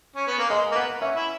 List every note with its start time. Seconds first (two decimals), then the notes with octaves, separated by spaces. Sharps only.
0.16 C#4
0.27 B3
0.38 A#3
0.50 G#3 D#5
0.72 A#3
0.75 B3 F#5
1.01 C#4 E5
1.15 E4